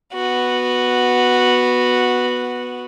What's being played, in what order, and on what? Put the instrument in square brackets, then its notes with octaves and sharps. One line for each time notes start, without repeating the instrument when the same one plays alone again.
[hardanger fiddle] B3 F#4